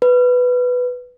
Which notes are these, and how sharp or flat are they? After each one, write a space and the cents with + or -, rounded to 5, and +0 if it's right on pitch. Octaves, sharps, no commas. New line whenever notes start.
B4 +5